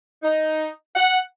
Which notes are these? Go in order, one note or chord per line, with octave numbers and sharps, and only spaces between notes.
D#4
F#5